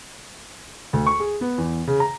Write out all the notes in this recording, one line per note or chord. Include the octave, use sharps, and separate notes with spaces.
D2
C#6
G#4
B3
E2
C#3
A#5